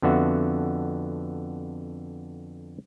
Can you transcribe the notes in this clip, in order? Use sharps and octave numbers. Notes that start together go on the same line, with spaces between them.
F2 D3 B3 F#4 E5